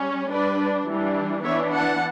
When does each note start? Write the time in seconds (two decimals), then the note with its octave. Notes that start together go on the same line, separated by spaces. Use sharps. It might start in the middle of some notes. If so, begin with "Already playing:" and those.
Already playing: G3 C#4
0.30 G3 D4 B4 D5
0.87 E3 G3 D4
1.43 E3 B3 D4 C#5 E5
1.72 F#5 A5